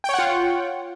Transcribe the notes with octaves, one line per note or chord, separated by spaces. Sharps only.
F4 C#5 F#5 G5